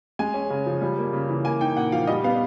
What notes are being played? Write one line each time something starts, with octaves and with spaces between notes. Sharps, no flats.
G#3 G#5
C#4
C#3
F3
G3
A#3
C#3
E3
A#3 G#5
D#4 G5
A#2 F#5
F3 F5
G3 D#5
B3 F5